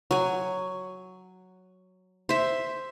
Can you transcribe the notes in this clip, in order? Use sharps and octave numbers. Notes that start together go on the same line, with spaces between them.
F#3 G#5
C5 E5